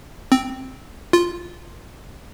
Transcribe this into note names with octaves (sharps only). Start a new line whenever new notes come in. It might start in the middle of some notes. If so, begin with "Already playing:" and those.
C4
F4